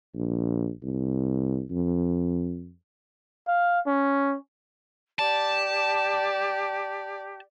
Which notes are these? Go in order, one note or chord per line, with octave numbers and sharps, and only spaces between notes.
A#1
C2
F2
F5
C#4
G4 D5 A5